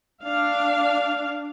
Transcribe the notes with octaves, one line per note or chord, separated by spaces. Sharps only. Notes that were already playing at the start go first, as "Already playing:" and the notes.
D4 F5